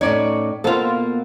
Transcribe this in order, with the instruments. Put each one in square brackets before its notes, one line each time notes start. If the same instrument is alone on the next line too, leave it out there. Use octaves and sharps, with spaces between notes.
[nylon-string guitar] A2 C#4 D#4 [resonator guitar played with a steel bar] C#5 D5
[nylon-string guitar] B2 A#3 C5 [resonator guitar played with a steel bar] F4 A4